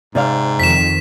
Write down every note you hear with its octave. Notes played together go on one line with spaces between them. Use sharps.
G#2 C3 D5 F5
F2 D#3 B6 E7